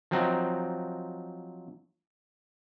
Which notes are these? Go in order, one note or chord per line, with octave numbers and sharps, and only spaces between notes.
F3 F#3 C4 D#4